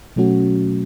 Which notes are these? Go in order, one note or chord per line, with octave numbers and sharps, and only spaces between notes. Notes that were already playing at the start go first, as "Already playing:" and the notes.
B2 F#3 A3 C#4 F#4